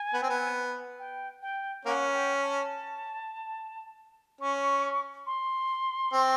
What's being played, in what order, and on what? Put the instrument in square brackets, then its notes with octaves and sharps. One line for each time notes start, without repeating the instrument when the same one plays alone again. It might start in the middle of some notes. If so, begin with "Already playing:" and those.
Already playing: [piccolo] G#5
[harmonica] B3
C4
B3
[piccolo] G5
G5
[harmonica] A#3 C#4 [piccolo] F#5
[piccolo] G5
A5
[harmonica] C#4 [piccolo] C#6
[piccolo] C6
[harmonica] C4